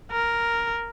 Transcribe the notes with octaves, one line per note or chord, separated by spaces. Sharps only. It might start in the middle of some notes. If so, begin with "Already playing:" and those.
A#4